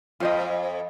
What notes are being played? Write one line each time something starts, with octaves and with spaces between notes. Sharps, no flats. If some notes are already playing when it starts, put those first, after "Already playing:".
F2 F4 C5 D#5